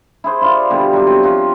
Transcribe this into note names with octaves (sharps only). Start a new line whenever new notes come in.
E4 G#4 C5
E4 F4 D5 F5
B2 D3 G3
F#3 G3
F#3 C4
F3 F#3 F4